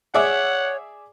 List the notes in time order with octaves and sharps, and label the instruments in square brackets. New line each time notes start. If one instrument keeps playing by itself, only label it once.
[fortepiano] G#4 D5 E5 [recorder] C#5 [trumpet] F#5